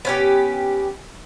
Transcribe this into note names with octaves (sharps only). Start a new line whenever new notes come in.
B3 C#4 G4